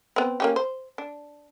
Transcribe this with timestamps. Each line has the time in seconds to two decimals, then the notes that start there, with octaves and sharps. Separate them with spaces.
0.16 B3 C4
0.40 A#3 C#4 G4
0.56 C5
0.98 D4